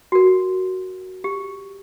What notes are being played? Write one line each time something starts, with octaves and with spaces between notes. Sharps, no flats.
F#4 A#4
G4